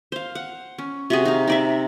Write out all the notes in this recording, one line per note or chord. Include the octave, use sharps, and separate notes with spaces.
C5 F5
F#5
C#4
C3 F#4 G#4
D#4 F5
D#4 D5 E5